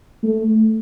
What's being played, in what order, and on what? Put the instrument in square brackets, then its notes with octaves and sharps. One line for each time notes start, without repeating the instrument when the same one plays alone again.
[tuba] A3